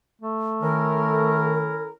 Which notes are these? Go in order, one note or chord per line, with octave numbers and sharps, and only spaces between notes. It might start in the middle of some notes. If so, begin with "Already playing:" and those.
A3
D#3 C#4 E4 A4 A#4